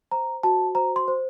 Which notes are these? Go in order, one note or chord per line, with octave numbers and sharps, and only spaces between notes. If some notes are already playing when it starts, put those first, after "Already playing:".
C5 A#5
F#4 A5
C5 A#5
C6
C5